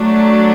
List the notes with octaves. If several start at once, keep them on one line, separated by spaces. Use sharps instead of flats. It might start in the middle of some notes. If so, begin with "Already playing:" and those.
Already playing: F#3 A3 D4